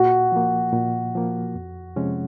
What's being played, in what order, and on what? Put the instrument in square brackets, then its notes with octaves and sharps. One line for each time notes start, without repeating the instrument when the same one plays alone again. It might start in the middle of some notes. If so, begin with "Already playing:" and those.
Already playing: [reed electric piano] A#2 [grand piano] F#4
[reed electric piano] F3 A#3
A#2
F3 A#3
F2
C3 F3 G#3 C#4